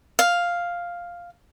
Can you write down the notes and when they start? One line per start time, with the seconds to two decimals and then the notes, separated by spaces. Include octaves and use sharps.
0.19 F5